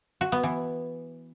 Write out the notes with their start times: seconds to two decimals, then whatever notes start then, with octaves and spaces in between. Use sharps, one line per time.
0.21 F#4
0.32 B3
0.43 E3